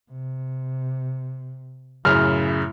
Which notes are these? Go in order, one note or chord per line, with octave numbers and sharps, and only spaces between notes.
C3
F#2 A2 C#3 E4 F6